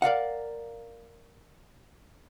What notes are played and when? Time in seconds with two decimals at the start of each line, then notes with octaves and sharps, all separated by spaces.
0.02 A#4 D5 F5 F#5